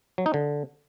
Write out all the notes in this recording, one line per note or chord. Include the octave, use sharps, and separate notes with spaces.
F#3
D#4
D3